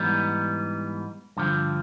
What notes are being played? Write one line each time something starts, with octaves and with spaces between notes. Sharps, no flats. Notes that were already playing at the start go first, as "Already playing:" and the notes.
Already playing: G#2 E3 G3 B3 D#4
G2 D3 F3